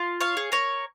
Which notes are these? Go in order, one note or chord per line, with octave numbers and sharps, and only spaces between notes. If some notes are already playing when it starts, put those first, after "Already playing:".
Already playing: F4
C#5 F5
G#4
A#4 C#5